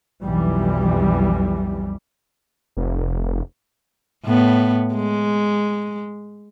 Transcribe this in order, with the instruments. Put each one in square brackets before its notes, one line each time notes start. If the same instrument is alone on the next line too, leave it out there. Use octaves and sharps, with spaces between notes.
[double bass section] B1 F2 E3 G3
[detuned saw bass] F1
[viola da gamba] A2 B3
G#3